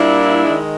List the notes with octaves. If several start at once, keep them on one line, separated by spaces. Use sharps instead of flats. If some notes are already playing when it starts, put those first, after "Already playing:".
Already playing: A#2 G3 A#3 D4 E4
D#3 G#3